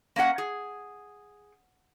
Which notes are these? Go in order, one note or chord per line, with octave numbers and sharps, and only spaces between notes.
A#3 C#4 D4 F#5
G#4